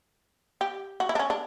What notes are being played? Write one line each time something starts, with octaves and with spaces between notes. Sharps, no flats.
G4
F#4
E4
D4
C#4
D4